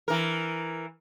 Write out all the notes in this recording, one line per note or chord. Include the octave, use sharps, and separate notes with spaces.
E3 A#4